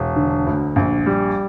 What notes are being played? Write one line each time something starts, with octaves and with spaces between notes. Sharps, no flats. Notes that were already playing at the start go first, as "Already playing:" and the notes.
Already playing: E1
D3
D2
A#1
G3